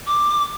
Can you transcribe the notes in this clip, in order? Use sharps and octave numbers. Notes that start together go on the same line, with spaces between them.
D6